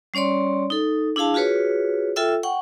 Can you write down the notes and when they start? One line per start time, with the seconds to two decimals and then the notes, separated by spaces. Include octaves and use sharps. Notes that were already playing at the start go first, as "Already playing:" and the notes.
0.14 G3 C#4 C#5 D5 C6
0.70 D#4 A4
1.16 D4 E4 G#4 F5 A5
1.34 F4 F#4 G#4 B4 C#5
2.16 F4 A4 E5 G5 E6
2.43 F#5 G5 C#6